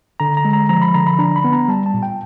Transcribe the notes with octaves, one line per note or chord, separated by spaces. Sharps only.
D3 A#5
A#5
G#3
A#5
F3 A#5
B5
D3 A#5
B5
D4 A#5
B5
B3
A#5
G3 A5
A5
A#2
G5